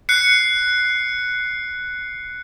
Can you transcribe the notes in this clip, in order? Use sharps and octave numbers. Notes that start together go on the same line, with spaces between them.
F#6 C7 C#7